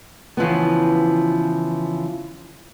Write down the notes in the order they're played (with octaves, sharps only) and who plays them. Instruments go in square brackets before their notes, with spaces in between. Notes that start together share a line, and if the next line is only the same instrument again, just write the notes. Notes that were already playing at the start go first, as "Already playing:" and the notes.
[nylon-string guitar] C#3 E3 F3 B3